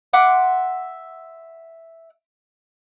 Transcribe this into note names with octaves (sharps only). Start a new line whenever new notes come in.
E5 F#5 C6 D6